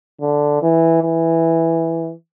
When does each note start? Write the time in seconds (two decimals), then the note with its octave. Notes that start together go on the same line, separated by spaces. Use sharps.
0.21 D3
0.62 E3
1.02 E3